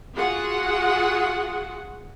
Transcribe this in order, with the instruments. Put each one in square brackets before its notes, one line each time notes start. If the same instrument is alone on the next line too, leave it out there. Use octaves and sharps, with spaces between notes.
[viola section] F4 F#4 G#4 F#5